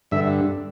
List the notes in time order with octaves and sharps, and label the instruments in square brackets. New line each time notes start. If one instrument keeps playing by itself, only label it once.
[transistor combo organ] G2 D3 E5